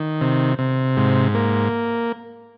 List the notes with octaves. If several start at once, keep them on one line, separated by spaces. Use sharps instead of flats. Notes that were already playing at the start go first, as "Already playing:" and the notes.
Already playing: D#3
C3
C3
G#2
A#3